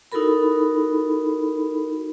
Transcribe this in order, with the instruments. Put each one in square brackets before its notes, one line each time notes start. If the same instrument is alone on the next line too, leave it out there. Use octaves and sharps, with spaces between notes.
[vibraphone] D#4 E4 F#4 A4 A#4 B5